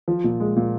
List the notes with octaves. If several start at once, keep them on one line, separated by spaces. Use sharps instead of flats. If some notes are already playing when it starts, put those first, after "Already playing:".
F3
A#2
G#3
A#2